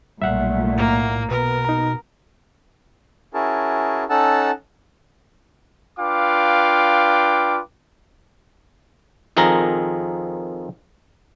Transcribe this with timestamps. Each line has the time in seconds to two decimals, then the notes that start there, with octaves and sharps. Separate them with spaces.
0.22 B1 A#2 G3 A3 E5 F#5 F#6
0.77 A2 A#3
1.31 B2 B3 A#4 B4
1.65 D#4 A#5
3.34 C#4 E4 F#4 G#4 A#4 A5
4.10 C#4 D#4 A4 F#5 A5 E6
5.99 D4 F4 B4 F5 G5 D6
9.37 F2 D#3 F3 G#4 A#4 A#5